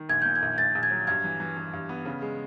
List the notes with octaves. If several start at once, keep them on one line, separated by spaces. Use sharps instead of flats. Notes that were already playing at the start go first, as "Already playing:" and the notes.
Already playing: D#3
A#1 G#6
A#2 G6
G#6
A#1
A#1 A6
A#1
G#6
F#3
G2 G#6
E3
E3
E3
G2
B3
C#3
G#3